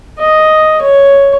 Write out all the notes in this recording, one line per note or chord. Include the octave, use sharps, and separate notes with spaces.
D#5
C#5